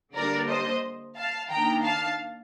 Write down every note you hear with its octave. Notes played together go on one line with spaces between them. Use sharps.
D3 G3 A#3 D4 A#4 D5
C5 D#5
F5 A5
D#3 A#3 D4 G5 A#5
F5 A5